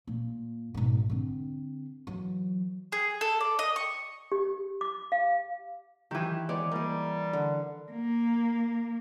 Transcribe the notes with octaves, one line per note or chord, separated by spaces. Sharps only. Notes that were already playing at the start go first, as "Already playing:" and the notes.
A#2
G#1 B2
D3 C4
E3 F#3
G#4
A4
D5
D#5
C#6
G4
D6
F5
D#3 E3 G4
G#3 B3 C#5 D5
G3 A#3 G#4
D3
A#3